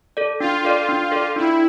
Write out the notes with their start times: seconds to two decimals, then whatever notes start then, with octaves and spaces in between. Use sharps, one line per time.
0.17 A4 D5
0.40 D4 F4
0.65 A4 D5
0.89 D4
1.12 A4 D5
1.36 D4 E4